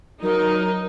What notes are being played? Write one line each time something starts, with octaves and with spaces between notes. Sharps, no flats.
F#3 D#4 A#4